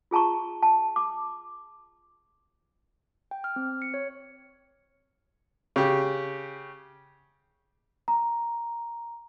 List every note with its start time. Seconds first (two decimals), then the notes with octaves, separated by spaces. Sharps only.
0.11 F4 G#4 A5 A#5 C#6
0.63 A5
0.96 D6
3.31 G5
3.44 F6
3.56 C4
3.82 C#7
3.94 C#5
5.76 C#3 G4
8.08 A#5